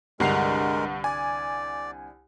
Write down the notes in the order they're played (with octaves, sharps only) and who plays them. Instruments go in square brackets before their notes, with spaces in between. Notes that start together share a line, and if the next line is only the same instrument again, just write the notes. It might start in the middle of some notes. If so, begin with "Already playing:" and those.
[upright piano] C2 D3 F7 [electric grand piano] G2 F#5 C7 [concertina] G#3 A#4
[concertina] D5 [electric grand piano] G#5